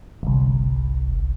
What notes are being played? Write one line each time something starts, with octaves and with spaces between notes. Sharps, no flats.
G1 C2